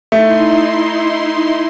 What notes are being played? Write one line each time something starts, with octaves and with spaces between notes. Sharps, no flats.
A3 D#4 E4 C6